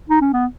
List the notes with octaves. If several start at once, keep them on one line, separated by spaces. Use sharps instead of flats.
D#4
C#4
B3